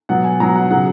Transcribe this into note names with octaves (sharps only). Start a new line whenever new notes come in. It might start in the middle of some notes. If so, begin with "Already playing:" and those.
B2 F#3 F#5
G#5
B2 F#3 A#5
F#5
C#3 F#3 F#5